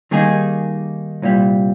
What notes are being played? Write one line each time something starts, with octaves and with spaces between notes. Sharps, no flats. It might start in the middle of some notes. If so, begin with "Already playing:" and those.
D#3 G3 A#3 D#4 G#4
C2 A#2 G3